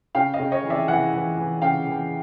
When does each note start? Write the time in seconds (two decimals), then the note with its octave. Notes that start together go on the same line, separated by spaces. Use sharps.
0.15 C#3 F5 G5
0.34 D#5 F5
0.40 C#3
0.52 C#5 D#5
0.64 E3
0.70 D5 E5
0.88 E3 E5 F#5
1.13 E3
1.37 E3
1.62 C#3 F5 G5
1.86 E3